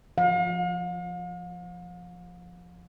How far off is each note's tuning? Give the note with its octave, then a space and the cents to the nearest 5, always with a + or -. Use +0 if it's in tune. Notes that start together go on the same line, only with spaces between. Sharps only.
F3 +0 F5 +45